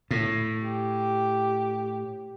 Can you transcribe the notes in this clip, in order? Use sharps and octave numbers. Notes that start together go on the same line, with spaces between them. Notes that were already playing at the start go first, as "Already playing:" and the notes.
A2
G4